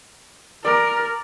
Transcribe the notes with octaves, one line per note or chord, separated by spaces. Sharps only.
A#4 D5